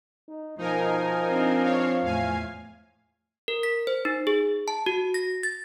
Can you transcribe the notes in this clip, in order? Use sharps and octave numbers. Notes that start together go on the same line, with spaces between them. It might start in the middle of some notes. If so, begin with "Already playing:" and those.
D#4
B2 F3 D#4 A#4 G#5
C4 D4
C#5 F5
E2 A2 F5 G#5
A#4
B6
C5
D#4
G#4
A5
F#4
A#6
A6